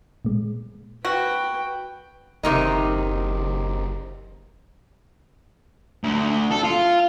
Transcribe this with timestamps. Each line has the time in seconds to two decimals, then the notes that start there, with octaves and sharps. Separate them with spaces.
0.25 A#2 G#3
1.05 F#4 B4 G5
2.43 F#1 C3 D#3 D#4
6.04 D2
6.51 A4
6.64 F4